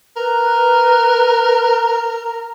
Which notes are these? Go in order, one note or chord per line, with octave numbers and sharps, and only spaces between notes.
A#4 B4